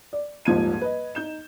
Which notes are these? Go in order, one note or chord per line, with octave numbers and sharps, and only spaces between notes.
D5
D#1 G#2 F3 G#6 D#7
B4 D#5
D#4 G6 E7